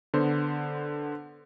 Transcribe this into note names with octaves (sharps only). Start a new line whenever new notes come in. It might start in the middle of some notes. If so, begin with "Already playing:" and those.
D3 B3 C5